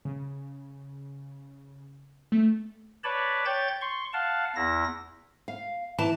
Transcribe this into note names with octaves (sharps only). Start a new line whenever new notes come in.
C#3
A3
B4 C#5 D5 A5 B5
C#5 G5 G6 A6
C6 C#6
F5 F#5 A5
E2 E4 A#6
F5
E3 A5